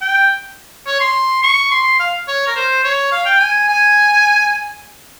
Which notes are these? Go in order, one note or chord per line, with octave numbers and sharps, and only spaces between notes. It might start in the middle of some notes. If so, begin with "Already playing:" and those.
G5
C#5
C6
C#6
C6
F5
C#5
A#4
C5
C#5
F5
G5
G#5
G#5